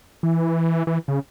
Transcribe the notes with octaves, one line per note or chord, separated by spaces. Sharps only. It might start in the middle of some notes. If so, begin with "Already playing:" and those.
E3
E3
C#3